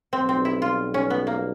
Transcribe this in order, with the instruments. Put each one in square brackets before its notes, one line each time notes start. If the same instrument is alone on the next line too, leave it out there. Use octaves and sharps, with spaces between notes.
[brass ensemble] B1 B2 G3 [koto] C4
[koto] C4
E4
F4
C#4
B3
A#3